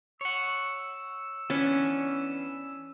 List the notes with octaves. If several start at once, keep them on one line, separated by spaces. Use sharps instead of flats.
C#5 F#5 E6
E3 B3 C#4 D4